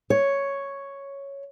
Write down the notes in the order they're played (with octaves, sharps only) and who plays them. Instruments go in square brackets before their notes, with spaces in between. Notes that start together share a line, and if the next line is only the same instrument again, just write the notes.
[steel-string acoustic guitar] C#5